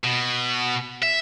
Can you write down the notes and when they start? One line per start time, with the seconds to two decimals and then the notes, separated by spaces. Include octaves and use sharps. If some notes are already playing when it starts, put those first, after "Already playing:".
0.04 B2
1.02 E5